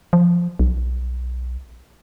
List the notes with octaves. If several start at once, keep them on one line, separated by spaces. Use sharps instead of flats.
F3
B1